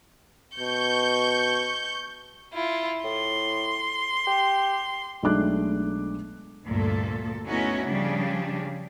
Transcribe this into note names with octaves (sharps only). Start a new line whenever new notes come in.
B2 C#6 G6
E4 F4
A2 C6
G4
B1 G#3 A3 D4 D6 F#6
D2 G2 A#2 A4
A3 B3 C#4 D#4 E4 F#4
C#3 F3 G3 D4